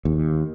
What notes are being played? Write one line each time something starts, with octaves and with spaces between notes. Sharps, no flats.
D#2